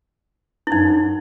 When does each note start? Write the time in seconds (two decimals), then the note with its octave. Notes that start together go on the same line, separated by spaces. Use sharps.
0.67 E4
0.71 F#2 D#4